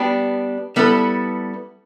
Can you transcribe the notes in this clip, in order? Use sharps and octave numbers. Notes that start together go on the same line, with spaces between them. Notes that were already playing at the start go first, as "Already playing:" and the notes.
Already playing: G3 B3 D4 G4
G3 B3 E4 A4